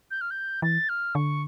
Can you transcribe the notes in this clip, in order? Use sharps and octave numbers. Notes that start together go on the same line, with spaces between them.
G6
F6
G6
E3 A6
F6
D3 C#6